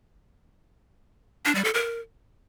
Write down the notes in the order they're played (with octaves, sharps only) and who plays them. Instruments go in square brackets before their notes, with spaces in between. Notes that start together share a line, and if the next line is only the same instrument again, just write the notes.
[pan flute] D4
G3
A4
A#4